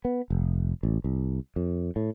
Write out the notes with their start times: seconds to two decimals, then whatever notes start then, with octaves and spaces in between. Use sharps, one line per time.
0.05 B3
0.30 F1
0.83 A1
1.04 C2
1.56 F2
1.96 A2